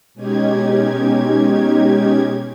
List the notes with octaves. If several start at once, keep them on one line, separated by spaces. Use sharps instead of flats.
B2 G#3 C#4 D#4 G4 G#6